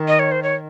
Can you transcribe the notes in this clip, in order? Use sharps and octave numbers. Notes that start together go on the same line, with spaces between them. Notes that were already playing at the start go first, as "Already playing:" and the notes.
Already playing: D#3
D#5
C#5
C5
C#5